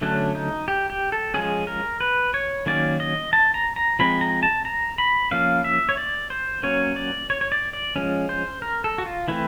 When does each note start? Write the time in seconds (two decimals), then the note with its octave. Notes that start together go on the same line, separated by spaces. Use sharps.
0.01 D3 F#3 A3 C#4 D4
0.35 D#4
0.68 G4
0.90 G4
1.12 A4
1.34 F3 G#3 C#4 G#4
1.67 A#4
2.00 B4
2.34 C#5
2.66 D#3 F#3 A#3 C#4 D5
3.00 D#5
3.33 A5
3.54 A#5
3.76 A#5
3.99 F3 G#3 C4 B5
4.21 A#5
4.43 A5
4.65 A#5
4.98 B5
5.31 F3 A#3 C#4 F5
5.64 E5
5.89 C#5
5.97 D5
6.30 C5
6.63 F#3 A#3 C#4 C#5
6.96 D5
7.30 C#5
7.41 C#5
7.52 D5
7.73 D5
7.96 F3 G#3 C#4
8.29 C5
8.62 A#4
8.84 A4
8.98 F#4
9.06 F4
9.28 E3 A3 C4 E4